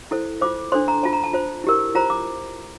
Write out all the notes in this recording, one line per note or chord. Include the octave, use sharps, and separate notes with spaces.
E4 A4 C5
F4 C5 D6
D4 A4 C5 C6
A#5
F4 C5 A5
A#5
A5
F4 C5
E4 G4 A#4
F4 C5 A#5
D6